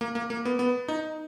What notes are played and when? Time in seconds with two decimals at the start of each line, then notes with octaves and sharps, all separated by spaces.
0.01 A#3
0.15 A#3
0.30 A#3
0.45 B3
0.59 B3
0.88 D#4